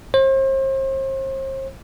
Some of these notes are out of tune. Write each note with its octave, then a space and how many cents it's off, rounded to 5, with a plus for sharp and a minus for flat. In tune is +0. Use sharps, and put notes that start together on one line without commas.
C5 +40